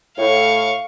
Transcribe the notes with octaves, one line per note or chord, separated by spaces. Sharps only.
A2 F5 C#6